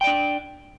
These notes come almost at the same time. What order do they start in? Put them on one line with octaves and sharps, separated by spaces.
G5 D5 D4